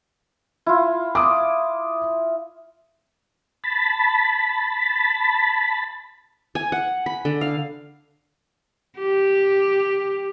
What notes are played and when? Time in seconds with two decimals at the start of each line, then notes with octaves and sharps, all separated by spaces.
0.66 E4 F4
1.15 D6 D#6
3.64 A5 B5
6.55 G#5
6.72 F#5
7.06 B5
7.25 D3
7.41 F5
8.99 G4